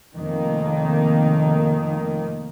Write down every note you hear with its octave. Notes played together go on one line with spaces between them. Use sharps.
F1 D#3 A#3